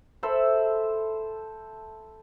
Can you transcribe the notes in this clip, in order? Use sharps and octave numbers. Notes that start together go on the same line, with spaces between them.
A4 C5 E5 B5